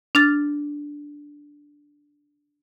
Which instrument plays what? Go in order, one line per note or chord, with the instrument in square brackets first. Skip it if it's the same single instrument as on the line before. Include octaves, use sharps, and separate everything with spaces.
[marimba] D4 F6 A6